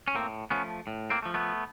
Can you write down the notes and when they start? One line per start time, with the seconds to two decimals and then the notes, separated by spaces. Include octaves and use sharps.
0.08 C#4
0.15 A2 A#3 C4
0.50 F3 A3 B3 C#4
0.87 A2
1.10 A#3 C4
1.23 A3
1.25 F3
1.34 A3 B3